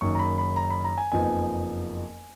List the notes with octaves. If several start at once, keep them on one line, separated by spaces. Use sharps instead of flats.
F#1 F#2 D#3 C#6
A#5
B5
B5
A#5
B5
A#5
G#5
F#1 F2 F3 B3 D#4 G#5